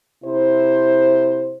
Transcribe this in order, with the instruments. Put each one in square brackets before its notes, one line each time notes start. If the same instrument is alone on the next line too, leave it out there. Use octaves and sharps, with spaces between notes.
[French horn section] C3 E4 C5